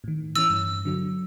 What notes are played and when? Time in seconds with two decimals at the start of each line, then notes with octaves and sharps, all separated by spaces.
0.04 A2 D#3
0.36 E3 C#4 E6
0.50 G2
0.85 D3 F#3